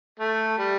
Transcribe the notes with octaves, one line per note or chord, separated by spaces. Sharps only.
A3
G3